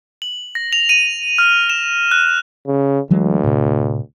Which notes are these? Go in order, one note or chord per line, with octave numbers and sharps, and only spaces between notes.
F#7
A#6
F7
D#7
F6
E7
F#6
C#3
D2 E3 F#3 G#3
A2 C3